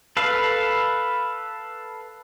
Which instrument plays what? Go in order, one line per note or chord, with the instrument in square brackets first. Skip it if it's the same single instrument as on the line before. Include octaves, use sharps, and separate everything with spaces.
[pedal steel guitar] A4 B4 F5